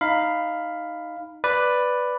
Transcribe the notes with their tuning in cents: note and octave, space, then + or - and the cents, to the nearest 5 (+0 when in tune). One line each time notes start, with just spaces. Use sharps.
D#4 +0 F5 +0 B5 +15
B4 +5 D5 +0